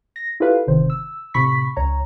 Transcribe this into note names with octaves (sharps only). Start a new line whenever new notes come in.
A#6
E4 F4 G4 A4 B4 F5
G1 C3 D#3 C5
E6
A2 C3 B5 C#6 B6
C#2 C#5 A#5